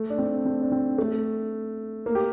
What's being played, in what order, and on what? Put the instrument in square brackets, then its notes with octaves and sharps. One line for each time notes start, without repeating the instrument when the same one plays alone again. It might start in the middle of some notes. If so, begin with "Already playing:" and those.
Already playing: [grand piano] A3
D4
C4
C4
D4
C4
A3
A#3
G4